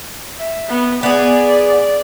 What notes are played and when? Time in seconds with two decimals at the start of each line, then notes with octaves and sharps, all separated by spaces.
0.39 E5
0.69 B3
1.03 B3 G#4 D5